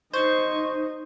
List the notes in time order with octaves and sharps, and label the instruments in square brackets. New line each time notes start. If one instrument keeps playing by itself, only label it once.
[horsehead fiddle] D#4 D#5 [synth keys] C5 [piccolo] C#6